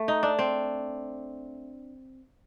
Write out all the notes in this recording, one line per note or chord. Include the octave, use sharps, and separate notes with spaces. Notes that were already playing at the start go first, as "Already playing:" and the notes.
Already playing: A3
D#4
D4
C4